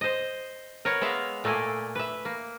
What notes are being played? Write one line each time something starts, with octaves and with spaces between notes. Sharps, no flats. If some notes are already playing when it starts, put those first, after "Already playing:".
C5 D#5
A#4 B4 C#5 F#5
G#3 B3 E5 F5
A#2 A3 A#3 D5 G#5
B4 E5
A#3